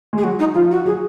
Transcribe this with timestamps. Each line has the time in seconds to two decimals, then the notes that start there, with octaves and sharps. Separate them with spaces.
0.13 G#3 G#4
0.24 F#3 F#4
0.39 D#4
0.54 F3 F4
0.71 F#4
0.85 F#3 G#4